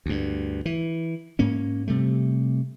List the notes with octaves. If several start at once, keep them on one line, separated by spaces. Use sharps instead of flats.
D2 G2
E3
G#2 A#3 C#4
C3 G3 A3